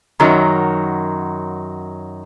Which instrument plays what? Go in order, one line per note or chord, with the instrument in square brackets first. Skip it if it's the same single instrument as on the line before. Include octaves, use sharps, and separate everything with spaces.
[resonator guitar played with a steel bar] F#2 D#3 F#3